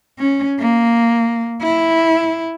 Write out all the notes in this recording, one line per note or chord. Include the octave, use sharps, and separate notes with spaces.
C#4
A#3
E4